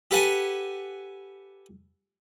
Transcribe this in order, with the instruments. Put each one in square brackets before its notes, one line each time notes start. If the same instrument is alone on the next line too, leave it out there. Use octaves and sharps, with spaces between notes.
[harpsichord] G4 A4 B4 F#5 G#5 A5